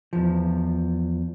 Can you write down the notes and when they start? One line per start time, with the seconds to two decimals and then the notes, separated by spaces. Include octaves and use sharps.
0.13 E2 F3